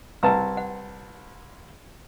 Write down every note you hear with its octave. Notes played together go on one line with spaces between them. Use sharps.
C2 B4 A5 A#5 E6
F#5